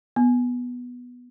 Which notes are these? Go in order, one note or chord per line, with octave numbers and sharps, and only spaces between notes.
B3